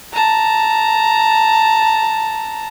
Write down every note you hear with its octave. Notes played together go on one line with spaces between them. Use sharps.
A5 A#5